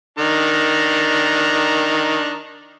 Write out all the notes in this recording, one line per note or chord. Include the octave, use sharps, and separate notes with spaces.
D#3 D4 A#5